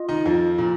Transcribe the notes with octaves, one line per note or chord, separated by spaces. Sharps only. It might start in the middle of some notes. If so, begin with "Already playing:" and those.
Already playing: F4 D#5
D#3 D#4
F2 F3
A#2